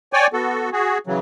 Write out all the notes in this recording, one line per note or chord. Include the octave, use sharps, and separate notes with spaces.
C#5 D5 G5 G#5
B3 F#4 A4
F#4 G#4
C#3 E3 F#3